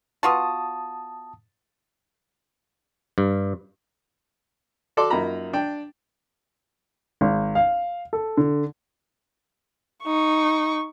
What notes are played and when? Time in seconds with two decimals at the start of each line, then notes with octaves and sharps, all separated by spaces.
0.23 B3 F4 F#4 A5 D#6
3.18 G2
4.97 F#4 A4 D5 C6 D6
5.10 F#2 A#3 D#4 F4 A#5 B5
5.53 D4 G5
7.21 G#1
7.55 F5
8.13 A4
8.37 D3
10.05 D#4 C#6